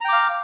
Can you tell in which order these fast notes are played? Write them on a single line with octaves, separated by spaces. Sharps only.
A#5 G5 D6 F5